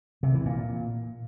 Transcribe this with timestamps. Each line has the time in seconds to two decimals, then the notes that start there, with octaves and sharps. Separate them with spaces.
0.23 C3
0.34 E3
0.46 A#2